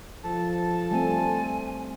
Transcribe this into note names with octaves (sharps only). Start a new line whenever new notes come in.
F3 A4 A5
G3 A3 C4 G#5